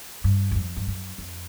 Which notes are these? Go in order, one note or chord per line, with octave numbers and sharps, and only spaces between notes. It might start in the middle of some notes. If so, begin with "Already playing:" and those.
G2
F#2
F2
G2
F#2
F2